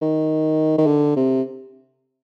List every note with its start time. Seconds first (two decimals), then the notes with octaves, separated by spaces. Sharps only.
0.02 D#3
0.78 D#3
0.87 D3
1.16 C3